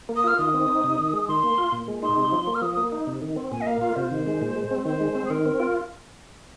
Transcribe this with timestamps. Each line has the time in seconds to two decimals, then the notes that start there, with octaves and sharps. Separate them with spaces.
0.09 A#3
0.16 D#6
0.24 F4 F6
0.39 D#3 D#6
0.54 C4
0.68 D#4
0.84 C3
0.98 D#3
1.13 G#3
1.28 D#3 C6
1.43 A#3
1.58 F4
1.72 A#2
1.88 G#3
2.02 D#4 C6
2.18 C3
2.32 F3
2.47 A#3
2.55 F6
2.62 F3 D#6
2.73 A#3 D#6
2.92 D#4
3.07 C3
3.22 D#3
3.36 C4
3.52 A#2 G#5
3.61 D#5
3.67 A#3 F5
3.81 F4 F5
3.96 C3 C5
4.11 D#3
4.27 G#3
4.41 A#2
4.56 G#3
4.71 C4
4.85 D#3 C5
5.00 G#3
5.15 C4
5.25 G#4
5.30 D#3 A#4
5.46 C4
5.60 F4